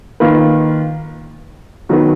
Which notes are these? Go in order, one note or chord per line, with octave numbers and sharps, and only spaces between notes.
D#3 A#3 F4 B4
D#3 F#3 B3 F#4 B4